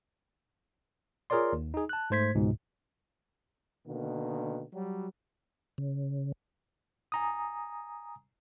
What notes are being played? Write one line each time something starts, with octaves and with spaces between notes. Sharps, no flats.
F4 G#4 A#4 C#5 D5 C6
D#2
D#4 G#4
A5 F#6
G#2 A3 C5 G#6 B6
C#2 G#2 B2
B2 D3 D#3 A#3
F#3 G3
C#3
G#5 A#5 D#6